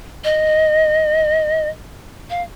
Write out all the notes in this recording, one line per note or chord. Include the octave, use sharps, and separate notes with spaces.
D#5
F5